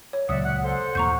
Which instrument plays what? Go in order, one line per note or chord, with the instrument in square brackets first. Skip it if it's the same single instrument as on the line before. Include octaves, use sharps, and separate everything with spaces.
[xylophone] C#5
[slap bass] C#2 A#2 F#3 [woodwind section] D5 E5 F#5 [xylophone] D#6
[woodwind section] F#5
A4 C5 F#5
[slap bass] D#2 A#2 E3 [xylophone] A#5 C#6 G6